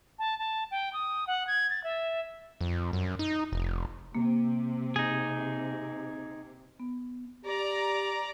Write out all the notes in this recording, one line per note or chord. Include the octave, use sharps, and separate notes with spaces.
A5
A5
G5
D#6
F#5
G#6
A6
E5
F2
F#2
D#4
F1
C3 A#3
D#4 G#4
B3
G4 D5 A#5